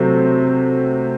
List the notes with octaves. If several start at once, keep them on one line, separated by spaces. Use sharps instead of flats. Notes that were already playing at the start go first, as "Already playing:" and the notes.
Already playing: C3 F#3 A3 C4